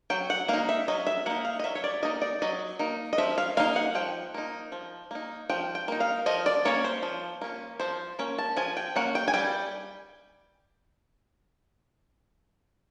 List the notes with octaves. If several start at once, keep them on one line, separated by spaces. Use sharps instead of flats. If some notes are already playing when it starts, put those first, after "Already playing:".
F#3 G5
F#5
A#3 D#4 F5
E5
F#3 D#5
E5
A#3 D#4 F#5
F5
D#5
F#3 E5
C#5
D5
A#3 D#4 D#5
D5
F#3 D#5
A#3 D#4
D#5
F3 E5
F5
A#3 D#4 F5
F#5
F3 G5
A#3 D#4
F3
A#3 D#4
F3 G5
G5
A#3 D#4
F5
F3 D#5
D5
A#3 C#4 C#5
C5
F3
A#3 C#4
F3 C5
A#3 C#4
A5
F3 G#5
G5
A#3 C#4 F#5
G5
G#5
G3 G5